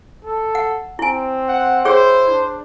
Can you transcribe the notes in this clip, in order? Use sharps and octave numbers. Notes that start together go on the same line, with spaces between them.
A4
F#5
C4 E4 G#5
F#5
E4 G#4 C5 C#5 G5
D4